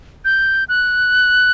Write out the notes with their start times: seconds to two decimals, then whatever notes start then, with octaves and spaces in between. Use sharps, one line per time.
0.25 G6
0.69 F#6